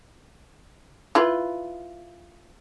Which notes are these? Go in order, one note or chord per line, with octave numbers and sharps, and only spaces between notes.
E4 F4 B4